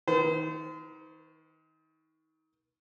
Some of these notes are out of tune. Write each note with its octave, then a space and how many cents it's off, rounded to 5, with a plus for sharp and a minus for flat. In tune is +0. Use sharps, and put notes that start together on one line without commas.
D#3 +30 C5 -35